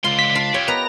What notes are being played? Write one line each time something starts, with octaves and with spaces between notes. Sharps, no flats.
C#2 D3 F4 C6
B6
D4 F4
C#2 G4 C#5
B3 A#4 D#5 A#5